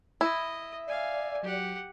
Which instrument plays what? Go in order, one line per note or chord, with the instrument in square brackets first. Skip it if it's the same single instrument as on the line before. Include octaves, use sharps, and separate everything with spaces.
[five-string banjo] E4 [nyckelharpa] D#5 [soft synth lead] E5
[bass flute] D5 [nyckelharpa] F5 G#5
[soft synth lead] F#3 [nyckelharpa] G4 F#5